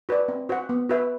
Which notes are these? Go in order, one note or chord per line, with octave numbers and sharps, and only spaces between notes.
F#4 B4 D5
C4
F#4 C5 F#5
B3
F#4 B4 E5